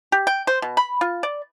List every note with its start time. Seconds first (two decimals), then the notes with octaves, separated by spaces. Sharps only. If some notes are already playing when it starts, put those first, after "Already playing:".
0.12 G4
0.27 G5
0.47 C5
0.62 B2
0.77 B5
1.01 F4
1.23 D5